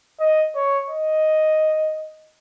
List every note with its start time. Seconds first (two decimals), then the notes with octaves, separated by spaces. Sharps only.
0.20 D#5
0.56 C#5
0.90 D#5